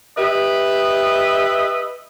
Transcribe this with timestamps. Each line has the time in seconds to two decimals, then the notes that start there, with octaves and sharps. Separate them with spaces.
0.17 G4 B4 D#5 E5